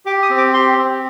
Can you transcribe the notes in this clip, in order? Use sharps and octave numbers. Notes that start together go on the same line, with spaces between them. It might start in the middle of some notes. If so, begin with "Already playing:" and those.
G4 D6
D#6
C4
D6
G4 C6
C4